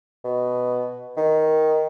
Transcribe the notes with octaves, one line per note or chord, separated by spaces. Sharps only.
B2
D#3